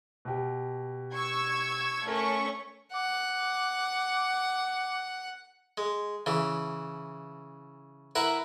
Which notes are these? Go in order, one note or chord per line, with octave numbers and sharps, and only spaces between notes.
B2 G4
C#6 E6 G#6
A3 C#4 A#4 C#6
F#5 D6
G#3
C#3 E3
E4 A#4 B4 E5 F#5